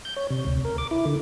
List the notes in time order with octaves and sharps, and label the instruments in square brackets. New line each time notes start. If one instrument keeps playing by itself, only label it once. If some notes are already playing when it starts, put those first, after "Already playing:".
[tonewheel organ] G6
C#5
C3
D2
A#4
D6
E4
D3